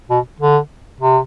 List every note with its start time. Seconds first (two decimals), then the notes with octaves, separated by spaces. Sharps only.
0.10 B2
0.40 D3
1.01 C3